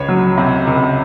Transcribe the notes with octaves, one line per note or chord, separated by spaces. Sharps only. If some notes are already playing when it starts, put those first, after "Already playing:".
Already playing: C#2 C#5
F#3
C3
C#2